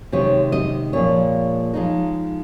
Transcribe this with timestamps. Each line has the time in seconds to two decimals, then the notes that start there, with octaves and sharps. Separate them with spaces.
0.12 C3 D#3 G#3 C#5
0.52 D#5
0.93 A#2 F3 G#3 C#5
1.74 F3 G#3 D#4